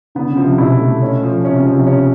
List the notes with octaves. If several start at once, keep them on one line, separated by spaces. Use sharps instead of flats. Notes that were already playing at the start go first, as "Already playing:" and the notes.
D3 B3
C#3
F3
C3
B2 E4
A3
C#4
F3
C3 C#4
C#3
F3
C3
C#4